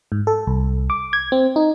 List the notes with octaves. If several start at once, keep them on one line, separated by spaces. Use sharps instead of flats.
G#2
A4
C2
D6
G#6
C4
D#4